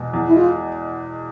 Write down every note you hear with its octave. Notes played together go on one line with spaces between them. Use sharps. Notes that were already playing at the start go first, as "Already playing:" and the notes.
Already playing: E2 B2 G#3
E2
E4
G#3 F4